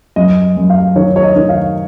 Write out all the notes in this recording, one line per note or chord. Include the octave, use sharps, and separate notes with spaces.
F#2 D#5
F#2
F5
D#3 C#5
C#5
D#5
D#3
F5